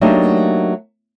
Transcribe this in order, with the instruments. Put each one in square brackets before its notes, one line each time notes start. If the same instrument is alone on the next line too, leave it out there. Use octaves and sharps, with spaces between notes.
[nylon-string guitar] F#3 A3 A#3 D4 D#4 G4